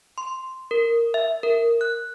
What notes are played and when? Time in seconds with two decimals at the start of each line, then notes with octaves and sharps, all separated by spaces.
0.18 C6
0.71 A#4
1.14 E5
1.43 A#4
1.81 F#6